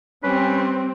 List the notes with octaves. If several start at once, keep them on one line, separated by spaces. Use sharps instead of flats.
G3 C4 C#4 B4